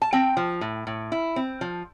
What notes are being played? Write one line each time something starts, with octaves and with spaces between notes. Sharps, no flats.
A5
C4 G5
F3
A2
A2
E4
C4
F3